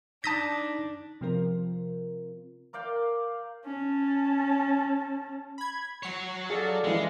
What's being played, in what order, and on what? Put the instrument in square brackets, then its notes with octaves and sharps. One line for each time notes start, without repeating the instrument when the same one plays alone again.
[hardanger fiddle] D4 [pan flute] D#4 [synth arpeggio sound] A5 D#6 G6 [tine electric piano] A#6 B6
[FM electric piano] C3 F3 C4 F4 A#4
[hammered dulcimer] A#4 D5 F5 G5
[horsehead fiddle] C#4 A5
[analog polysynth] B5 G#6
[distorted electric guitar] F#3 C#5 [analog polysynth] C7
[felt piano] G#4 [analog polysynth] A4 D5 F5
[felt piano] E3 C#7 [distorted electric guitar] G#3